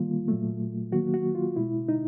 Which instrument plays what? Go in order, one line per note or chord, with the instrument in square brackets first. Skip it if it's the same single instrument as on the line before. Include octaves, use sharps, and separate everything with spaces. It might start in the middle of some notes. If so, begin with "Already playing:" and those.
Already playing: [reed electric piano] D#3 G3 A#3 F4
A#2 F#3 A3
D#3 F#3 A#3 F#4
F#4
F4
B2 G#3 E4
D#4